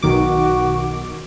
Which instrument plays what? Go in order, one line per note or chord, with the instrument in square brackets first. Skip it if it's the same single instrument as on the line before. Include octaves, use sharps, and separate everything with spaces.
[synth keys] B1 D#3 D6 [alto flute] F#4